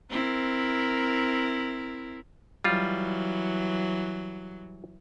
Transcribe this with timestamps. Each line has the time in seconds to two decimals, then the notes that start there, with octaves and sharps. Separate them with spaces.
0.10 C4 E4 A#4
2.64 E3 F#3 G3 F4